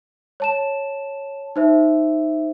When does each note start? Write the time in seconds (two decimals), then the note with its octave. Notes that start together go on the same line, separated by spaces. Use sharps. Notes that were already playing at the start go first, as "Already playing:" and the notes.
0.40 C#5 A5 E7
1.56 D#4 C5 E5